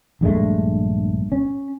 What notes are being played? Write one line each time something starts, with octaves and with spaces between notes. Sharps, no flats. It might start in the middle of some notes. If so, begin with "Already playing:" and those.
A#1 G2 G#3 A3
C#4